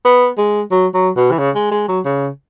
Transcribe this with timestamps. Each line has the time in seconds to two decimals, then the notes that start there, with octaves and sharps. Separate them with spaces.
0.05 B3
0.38 G#3
0.71 F#3
0.94 F#3
1.16 B2
1.31 E3
1.38 C#3
1.55 G#3
1.72 G#3
1.88 F#3
2.05 C#3